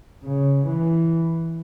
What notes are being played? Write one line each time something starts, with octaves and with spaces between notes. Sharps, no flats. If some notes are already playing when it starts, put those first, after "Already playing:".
C#3
E3